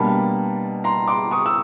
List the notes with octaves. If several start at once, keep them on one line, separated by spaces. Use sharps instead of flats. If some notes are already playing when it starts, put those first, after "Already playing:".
Already playing: B2 G3 A#3 D4 A5 B5
A#5 C6
C6 D6
C#6 D#6
E6